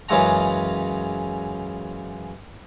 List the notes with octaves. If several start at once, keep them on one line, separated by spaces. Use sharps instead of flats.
F#2 C#3 E3 G#3 F#5 A#5